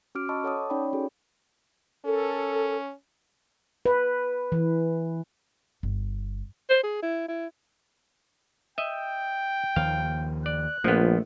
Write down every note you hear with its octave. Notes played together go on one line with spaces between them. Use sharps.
C#4 F#4 D6 F6 D7
D#5 A5 B5 C#6 E6
A4 C#5 F#5 A5 D6 D#6
C#4 D#4 C#5 D5 G5 B5
C#4 F#4 G#4 A4
C#4 A4 A#4
B4
E3
G1
C5
G#4
E4
E4
D#5 E5 G5
D#2 D#3 F3 F5
D5 F#6
A#1 F3 A3 B3